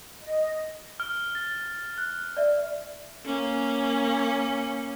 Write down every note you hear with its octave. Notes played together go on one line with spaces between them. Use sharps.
D#5
F6
A6
F#6
D5 E5
A#3 C#4